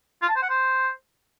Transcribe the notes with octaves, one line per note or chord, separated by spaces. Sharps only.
F4
A5
C5
F#5
C5